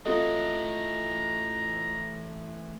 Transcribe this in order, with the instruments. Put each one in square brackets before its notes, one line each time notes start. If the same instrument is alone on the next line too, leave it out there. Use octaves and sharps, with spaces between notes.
[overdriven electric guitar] E3 A3 [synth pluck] C4 F#4 A4 [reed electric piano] F4 D#5 [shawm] A#5